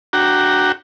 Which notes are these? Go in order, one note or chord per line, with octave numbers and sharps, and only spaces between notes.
D4 F#4 F#5 G5 A#5